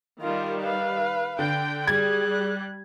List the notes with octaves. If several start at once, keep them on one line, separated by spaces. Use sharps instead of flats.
D#3 G3 F4 A#4
B4 F5
D3 G5
G3 G#4 F#6 G#6